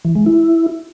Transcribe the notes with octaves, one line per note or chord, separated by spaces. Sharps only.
E3
G#3
E4